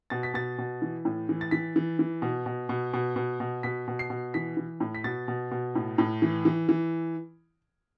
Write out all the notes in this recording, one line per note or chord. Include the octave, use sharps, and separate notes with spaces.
B2 A6
B6
B2 A6
B2
E3
A2
E3
A6
E3 B6
E3
E3
B2
B2
B2
B2
B2
B2
B2 B6
B2
C7
B2
E3 B6
E3
A2
B6
B2 A6
B2
B2
A2
A2
E3
E3
E3